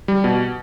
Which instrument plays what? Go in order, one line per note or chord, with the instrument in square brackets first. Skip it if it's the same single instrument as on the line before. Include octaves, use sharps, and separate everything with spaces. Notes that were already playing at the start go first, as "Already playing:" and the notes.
[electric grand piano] G3
B2